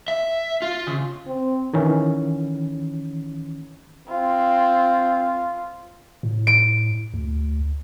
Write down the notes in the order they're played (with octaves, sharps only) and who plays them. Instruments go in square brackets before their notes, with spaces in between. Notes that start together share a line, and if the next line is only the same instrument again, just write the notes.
[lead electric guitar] E5
F4
C#3
[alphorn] C4
[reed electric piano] D#3 E3 C#4
[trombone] C4 [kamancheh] F4
[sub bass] A2
[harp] D7
[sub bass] D2